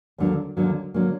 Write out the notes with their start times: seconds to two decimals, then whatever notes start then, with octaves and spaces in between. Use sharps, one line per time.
0.18 D#2 D3 F#3 A#3
0.57 D#2 D3 F#3 A#3
0.94 D3 F#3 A#3